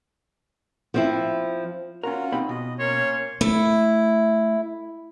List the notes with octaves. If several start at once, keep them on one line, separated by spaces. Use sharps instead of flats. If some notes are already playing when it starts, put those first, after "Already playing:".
F3 C4 E4
C#4 F4 F#4 A#4
C4 D#4 B5
B2 D#5
A#3 C#4 C#5 C6
A3 E4